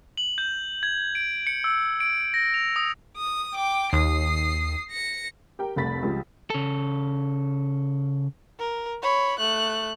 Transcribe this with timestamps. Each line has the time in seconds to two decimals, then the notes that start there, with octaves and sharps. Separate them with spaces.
0.17 F#7
0.38 G6
0.83 G#6
1.15 D7
1.47 C#7
1.64 E6
2.00 D7
2.34 A#6
2.54 F7
2.76 D#6
3.17 D#6
3.54 G5 D6
3.93 D#2 D#6 C7
4.91 A#6 C#7
5.59 G4 A#4 G5
5.76 F1 C2 A3 B5 A6 B6
6.02 C#2 F3 G3 G#3
6.50 C#3 A4
8.59 A#4
9.02 C#5 B5
9.39 A3 F#6